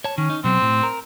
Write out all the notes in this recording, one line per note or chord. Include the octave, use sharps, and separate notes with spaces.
C#5 A5
D#3 C#4
D#4
B2 F#3 C4
A2
A#4